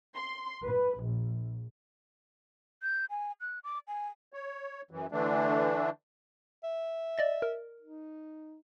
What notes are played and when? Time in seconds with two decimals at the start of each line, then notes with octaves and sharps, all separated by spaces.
0.15 C6
0.63 B4
1.01 A#1
2.83 G6
3.10 G#5
3.41 F#6
3.64 D6
3.88 G#5
4.33 C#5
4.91 F#2 E3
5.12 D3 E3 A3 D4
6.64 E5
7.18 D5 D#5 A6
7.42 A#4
7.81 D#4